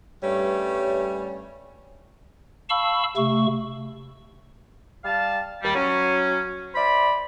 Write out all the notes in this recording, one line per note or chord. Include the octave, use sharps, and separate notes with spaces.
G2 G3 A3 C#4 B4 C#5
F5 A5 B5 C#6 E6
C3 A3 C#6
G3 F5 A5
D#2 G3
F#3 C#4
C5 D5 E5 B5